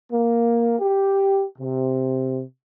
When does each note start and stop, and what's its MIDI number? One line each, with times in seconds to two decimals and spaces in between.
0.12 0.74 58
0.79 1.44 67
1.59 2.42 48